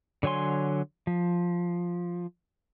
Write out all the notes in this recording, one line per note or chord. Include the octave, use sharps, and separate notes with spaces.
D3 F#3 C#5 G#5 C6
F3